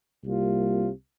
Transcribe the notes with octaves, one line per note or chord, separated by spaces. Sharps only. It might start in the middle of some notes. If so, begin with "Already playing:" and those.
C2 C3 G3 A#3 F4